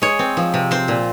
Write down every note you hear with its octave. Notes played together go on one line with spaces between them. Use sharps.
G#3 C#5
C4
F3
C3
C4 C5
A#2